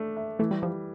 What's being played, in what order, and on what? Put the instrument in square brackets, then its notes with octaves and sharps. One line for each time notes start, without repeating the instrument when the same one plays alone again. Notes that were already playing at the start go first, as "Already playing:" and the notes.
Already playing: [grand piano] A3 D4
E5
[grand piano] E3 [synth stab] A3
[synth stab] G3
[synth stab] F3 [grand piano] G3